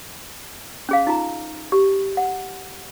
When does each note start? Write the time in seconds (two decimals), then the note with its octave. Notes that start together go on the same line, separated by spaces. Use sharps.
0.89 C#4 G#4 F5
1.07 D#4 F4 A#5
1.72 G4
2.17 F#5